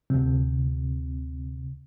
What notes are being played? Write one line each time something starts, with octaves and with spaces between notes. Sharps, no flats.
D2 C3